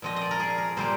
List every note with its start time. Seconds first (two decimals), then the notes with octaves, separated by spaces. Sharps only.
0.02 A#2 F3 C4 D#5
0.16 D#5
0.21 D5
0.31 A#4
0.40 G#4
0.58 A#4
0.77 A#2 G3 A#3 C5